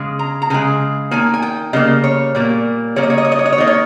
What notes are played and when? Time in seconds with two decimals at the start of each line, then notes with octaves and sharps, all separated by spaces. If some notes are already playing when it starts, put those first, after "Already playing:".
Already playing: C#3 G#3
0.19 A#5
0.42 A#5
0.50 C#3 G#3 G#5
1.11 D#3 A#3 G#5
1.34 G#5
1.42 G5
1.73 C#3 G3 A#3 D#5
2.04 C#5
2.35 A#2 G3 A#3
2.96 C#3 G3 A#3 C#5
3.03 D#5
3.10 C#5
3.18 D#5
3.25 C#5
3.32 D#5
3.39 C#5
3.46 D#5
3.52 C#5
3.58 D#3 A#3 D#5
3.67 C#5